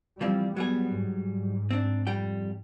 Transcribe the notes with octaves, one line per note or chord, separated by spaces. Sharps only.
E3 F3 G3 C4
F#3 G3 B3 G#4
G#2
C4 D4
F2 G3 G5